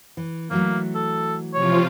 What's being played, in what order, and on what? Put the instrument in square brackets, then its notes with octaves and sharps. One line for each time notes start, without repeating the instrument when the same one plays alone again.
[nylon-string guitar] E3
[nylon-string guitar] E3 F#3 A3 [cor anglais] A#3
[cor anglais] A4
[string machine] C3 F3 F4 [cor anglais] C#5